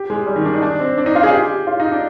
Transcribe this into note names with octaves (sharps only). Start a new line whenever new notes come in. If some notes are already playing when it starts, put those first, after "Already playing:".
Already playing: G4
G#3
G3
D#3
D4
D#4
D4
C4
D4
D#4
F4
G#4
G4
F4
D#4
D4